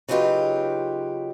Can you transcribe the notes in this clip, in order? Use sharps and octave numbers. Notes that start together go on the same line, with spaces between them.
C#3 F#3 D#4 F4 G4 B4